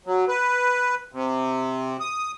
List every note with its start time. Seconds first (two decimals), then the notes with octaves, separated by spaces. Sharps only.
0.06 F#3
0.28 B4
1.13 C3
2.00 D#6